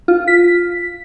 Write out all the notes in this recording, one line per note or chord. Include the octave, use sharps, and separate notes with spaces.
F4
B6